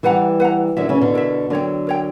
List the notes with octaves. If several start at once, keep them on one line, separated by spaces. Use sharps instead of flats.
E3 G3 B4 F#5 A#5
B4 F#5 A#5
D3 F#3 E4 A#4 E5
C#3 E3
B2 D3
E4 A#4 E5
D3 F#3 A#4 C#5 G5
A#4 C#5 G5